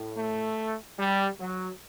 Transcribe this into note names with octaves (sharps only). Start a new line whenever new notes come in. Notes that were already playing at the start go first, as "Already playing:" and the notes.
Already playing: A2
A3
G3
F#3